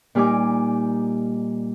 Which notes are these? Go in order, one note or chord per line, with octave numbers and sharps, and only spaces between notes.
A#2 G3 D#4 G#5 D6